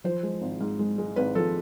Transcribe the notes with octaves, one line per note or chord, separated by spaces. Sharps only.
F3 C5
G#3
G#1
G#2
G#3
G#3
G#1 B4
F3 A4